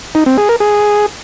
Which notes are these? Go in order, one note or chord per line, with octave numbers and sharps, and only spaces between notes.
D#4
C4
G#4
A#4
G#4